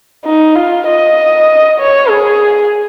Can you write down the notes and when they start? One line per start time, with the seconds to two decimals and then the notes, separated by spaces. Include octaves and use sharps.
0.25 D#4
0.55 F4
0.87 D#5
1.79 C#5
2.10 G#4